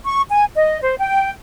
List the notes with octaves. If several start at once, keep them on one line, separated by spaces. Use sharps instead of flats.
C#6
G#5
D#5
C5
G5